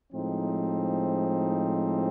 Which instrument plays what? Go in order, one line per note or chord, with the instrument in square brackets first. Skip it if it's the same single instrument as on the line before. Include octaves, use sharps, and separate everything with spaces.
[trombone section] A2 F3 G#3 C4 D#4